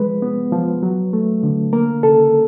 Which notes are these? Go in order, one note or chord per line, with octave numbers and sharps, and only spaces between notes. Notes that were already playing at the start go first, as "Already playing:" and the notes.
Already playing: F3 G#3 B4
B3
F3
F#3
A3
D3
A#3 A#4
C#3 A4